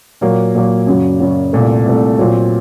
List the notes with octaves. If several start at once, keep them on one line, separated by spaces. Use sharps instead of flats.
A#2 F#3 A#3
A#2 F#3 A#3
F#2 C#3 F#3
F#2 C#3 F#3
C2 A#2 A3
C2 A#2 A3
A#2 F#3 C4 F4